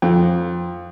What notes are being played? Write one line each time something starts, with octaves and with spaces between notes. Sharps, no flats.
F2